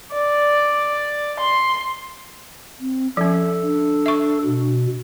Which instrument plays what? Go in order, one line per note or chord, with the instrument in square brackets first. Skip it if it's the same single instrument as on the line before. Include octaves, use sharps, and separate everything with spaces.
[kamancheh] D5
C6
[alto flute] C4
[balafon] F3 C#4 [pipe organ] A4 [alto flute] E5
[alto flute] D4
[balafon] E5 C#6
[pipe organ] B2